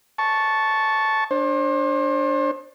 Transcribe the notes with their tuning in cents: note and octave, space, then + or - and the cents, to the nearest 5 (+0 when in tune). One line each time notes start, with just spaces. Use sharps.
A5 -10 C#6 +0
D4 +0 C5 +35